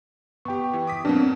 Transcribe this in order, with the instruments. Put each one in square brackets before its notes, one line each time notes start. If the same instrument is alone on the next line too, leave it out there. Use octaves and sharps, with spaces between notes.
[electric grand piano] B3 G4 [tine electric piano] G5 C#6
[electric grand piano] E3
D6 D#6 B6
[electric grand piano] B2 F#3 A#3 [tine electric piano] C4 D4